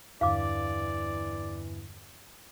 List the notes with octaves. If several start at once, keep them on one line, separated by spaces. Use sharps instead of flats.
E2 G2 D3 E3 D5 F5 D6